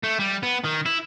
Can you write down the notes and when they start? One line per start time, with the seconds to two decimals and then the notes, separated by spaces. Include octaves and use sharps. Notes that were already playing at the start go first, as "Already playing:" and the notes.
0.03 A3
0.19 G3
0.43 B3
0.64 D#3
0.86 E4